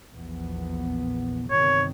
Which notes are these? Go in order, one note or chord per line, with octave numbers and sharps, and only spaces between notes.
A#1 E2 B3
G1 C3 D#3 C#5